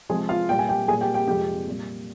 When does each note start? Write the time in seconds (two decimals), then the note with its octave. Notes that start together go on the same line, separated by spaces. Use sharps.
0.09 C3 F3 G#3 G#4
0.29 F4 F5
0.49 A#2 G3 G5
0.59 G#5
0.69 G4 G5
0.88 A#2 G#4 G#5
0.92 G3
1.01 G4 G5
1.14 G4 G5
1.27 F2 C3 F3 G#3 G4 G5
1.67 A#2 G3